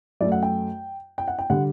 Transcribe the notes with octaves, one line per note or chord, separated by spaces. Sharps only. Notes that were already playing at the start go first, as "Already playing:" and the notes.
F#2 F#3 A3 D5
F#5
G5
G5
F#5
G5
D3 G3 F#5